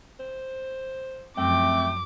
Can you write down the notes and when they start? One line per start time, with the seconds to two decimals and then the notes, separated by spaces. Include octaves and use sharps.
0.20 C5
1.38 F#2 F3 A3 C4 G5 D6